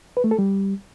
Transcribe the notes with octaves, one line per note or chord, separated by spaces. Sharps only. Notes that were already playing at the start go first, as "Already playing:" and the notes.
B4
A3
A4
G3